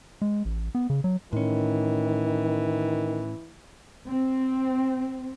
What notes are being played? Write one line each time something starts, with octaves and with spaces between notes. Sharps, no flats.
G#3
A1
B3
C#3
F#3
A2 D#3 E3 C#4
C4